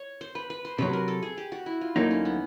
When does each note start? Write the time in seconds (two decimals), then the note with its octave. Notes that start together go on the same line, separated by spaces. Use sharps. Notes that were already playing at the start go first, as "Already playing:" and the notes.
Already playing: C#5
0.21 C5
0.35 B4
0.50 B4
0.65 C5
0.78 C3 D#3 F#3 B4
0.93 A#4
1.08 A4
1.23 G#4
1.37 G4
1.52 F#4
1.66 E4
1.81 F4
1.96 D2 D3 F#3 A#3 D#4 E4
2.11 C#4
2.25 B3